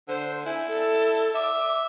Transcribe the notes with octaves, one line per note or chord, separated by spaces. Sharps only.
D3 C5
E4 G#5
A4
E5 D6